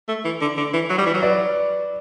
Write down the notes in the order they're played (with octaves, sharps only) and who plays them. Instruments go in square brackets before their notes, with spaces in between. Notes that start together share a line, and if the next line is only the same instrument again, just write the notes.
[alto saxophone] A3
E3
D3
D3
E3
F#3
G3
E3
F#3
[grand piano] B4 D5